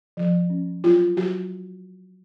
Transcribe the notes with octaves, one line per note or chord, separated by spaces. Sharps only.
F3
C#4
F#3 F4
F#3 F#4